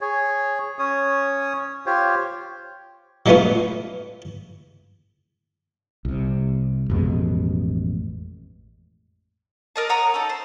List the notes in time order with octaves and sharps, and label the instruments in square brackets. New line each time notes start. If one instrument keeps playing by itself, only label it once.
[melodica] G#4 C#5
C#4 C#5 D#6
F4 G4 C5 C#5
[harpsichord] F#3 G#3 A3 B3 C#4 F4
[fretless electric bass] C2 C3
A1 F2 B2 G#3
[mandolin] A#4 D#5 A5
C#5 F#5 A#5 D#6
D#4 A4
C5